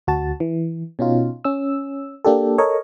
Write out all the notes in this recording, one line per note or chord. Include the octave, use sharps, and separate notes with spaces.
D2 F#4 A5
E3
B2 C#4 D#4 F4
C#4 E6
A#3 D4 G4 A4
A4 A#4 C#5 D#5